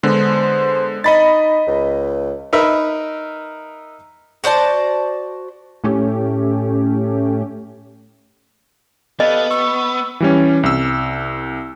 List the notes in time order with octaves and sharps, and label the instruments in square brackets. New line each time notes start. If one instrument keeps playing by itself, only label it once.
[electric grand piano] D3 G#3 B3 [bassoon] C5
[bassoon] D#4 [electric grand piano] D#5 B5 A6
[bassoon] C#2
[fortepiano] D#4 A#4 B4 E5
[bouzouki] F#4 C5 D5 A5
[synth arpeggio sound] A2 A3 C#4 G4
[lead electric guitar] B3 [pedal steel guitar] G4 A4 F5 [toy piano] D#5
[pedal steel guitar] C#6 [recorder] E6
[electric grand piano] E3 G3 C#4
C2 E6